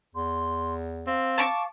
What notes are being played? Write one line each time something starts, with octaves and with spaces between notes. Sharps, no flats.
E2 C6
C4 F5
A5 C#6 D6